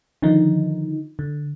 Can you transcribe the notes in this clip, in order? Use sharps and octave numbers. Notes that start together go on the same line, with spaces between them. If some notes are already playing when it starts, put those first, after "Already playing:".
D3 D#3 F3 D#4
D3